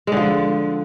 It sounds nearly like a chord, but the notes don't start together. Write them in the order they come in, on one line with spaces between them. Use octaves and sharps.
G#3 D3 F3